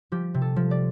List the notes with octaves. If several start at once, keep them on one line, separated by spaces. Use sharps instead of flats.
F3 G4
C3
A4
F3
D5